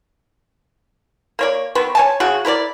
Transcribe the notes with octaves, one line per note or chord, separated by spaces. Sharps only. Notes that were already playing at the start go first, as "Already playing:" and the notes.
A#3 C#5 D5
D#3 B3 C4 C#6
C#5 G#5 A5
C#3 F#4
E4 A#4 C#5 D5